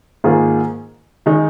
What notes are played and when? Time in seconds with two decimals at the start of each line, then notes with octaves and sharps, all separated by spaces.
0.24 G#2 D#3 A#3 F4 G#4
1.26 D#3 G#3 D#4